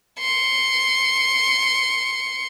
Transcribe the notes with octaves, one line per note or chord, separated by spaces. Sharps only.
C6 C#7